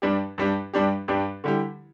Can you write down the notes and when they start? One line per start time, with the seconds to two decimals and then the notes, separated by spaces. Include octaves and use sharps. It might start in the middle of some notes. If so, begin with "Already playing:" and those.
0.02 G2 G3 D4 G4
0.38 G2 G3 D4 G4
0.73 G2 G3 D4 G4
1.08 G2 G3 D4 G4
1.44 D3 G3 E4 G4